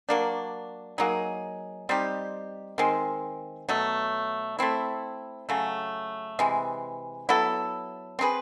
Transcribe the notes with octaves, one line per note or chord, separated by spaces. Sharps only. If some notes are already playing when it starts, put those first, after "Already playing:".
F#3 A#3 D4
F#3 A#3 D#4 G#4
G3 C4 D#4 G4
D#3 G#3 C4
B2 F#3 A3
A3 C4 E4
C#3 F#3 A3
C3 E3 G#3
F#3 B3 E4 A4
C4 D#4 G#4 B4